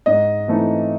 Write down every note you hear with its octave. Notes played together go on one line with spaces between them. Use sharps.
G#2 D#5
E3 A3 C4 D#4